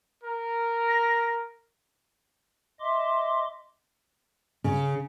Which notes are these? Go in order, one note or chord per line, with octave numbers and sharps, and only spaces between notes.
A#4
A#6
D#5 E5 C6 D6
C#3